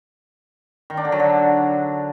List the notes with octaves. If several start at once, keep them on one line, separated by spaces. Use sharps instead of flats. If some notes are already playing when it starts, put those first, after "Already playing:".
D#3
D4
D3
F#3
D3